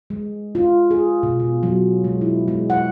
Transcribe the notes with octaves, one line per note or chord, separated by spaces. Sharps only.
G#3
F4
G#4
B2
B2
F#3
G#3
E4
G#3
F#5